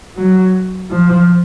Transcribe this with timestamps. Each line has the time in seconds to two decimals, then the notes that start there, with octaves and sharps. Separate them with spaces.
0.17 F#3
0.91 F3